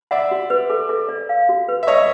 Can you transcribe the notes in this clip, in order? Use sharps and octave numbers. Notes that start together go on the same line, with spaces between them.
D5 E5 F#5
F#4
B4
A4
A4
D5
F5
F#4
B4
E5
C#5 D#5 C#6